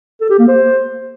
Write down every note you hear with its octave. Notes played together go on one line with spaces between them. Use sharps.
A4
G4
A#3
C5